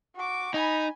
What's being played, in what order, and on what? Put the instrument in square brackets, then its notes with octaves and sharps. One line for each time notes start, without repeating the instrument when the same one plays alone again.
[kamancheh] F#4 D6
[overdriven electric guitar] D#4 [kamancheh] G#5 B5